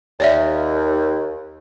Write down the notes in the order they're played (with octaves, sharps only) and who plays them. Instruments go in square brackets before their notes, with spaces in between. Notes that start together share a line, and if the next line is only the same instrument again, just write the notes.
[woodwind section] D#2 [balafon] C#5 D5 E5